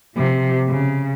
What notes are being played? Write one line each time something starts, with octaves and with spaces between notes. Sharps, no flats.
C3 F3
C#3